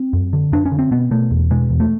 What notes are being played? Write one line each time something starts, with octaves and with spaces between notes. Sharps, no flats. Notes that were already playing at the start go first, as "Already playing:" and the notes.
Already playing: C4
F#2
D3
F#2 D4
C#4
D3
C4
B2 B3
B2 A3
E2
B2 G#3
E2
A3